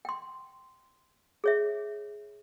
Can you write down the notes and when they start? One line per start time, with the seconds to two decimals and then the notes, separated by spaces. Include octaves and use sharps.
0.05 G5 C6
1.44 G#4 C#5 E5